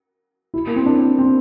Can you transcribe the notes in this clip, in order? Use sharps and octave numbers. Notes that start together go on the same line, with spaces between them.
E4
A#3
C4
D4
C4